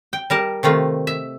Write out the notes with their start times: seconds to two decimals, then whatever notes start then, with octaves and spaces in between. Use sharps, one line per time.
0.13 G5
0.30 G3 A#4 A5
0.63 C3 D#3 A3 F4
1.07 E5